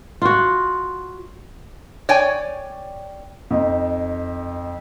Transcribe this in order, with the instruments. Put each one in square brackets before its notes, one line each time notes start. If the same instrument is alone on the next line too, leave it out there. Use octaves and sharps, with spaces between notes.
[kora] F4 F#4
[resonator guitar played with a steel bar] C#5 D5 G5 G#5
[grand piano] F2 D#4